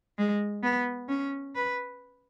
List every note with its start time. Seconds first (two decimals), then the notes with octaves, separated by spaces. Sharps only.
0.18 G#3
0.63 B3
1.09 C#4
1.56 B4